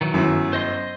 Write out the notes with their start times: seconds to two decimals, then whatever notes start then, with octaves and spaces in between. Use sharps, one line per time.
0.01 D#3 E3 F#3
0.13 G1 F#2 E4
0.53 C5 D#5 C6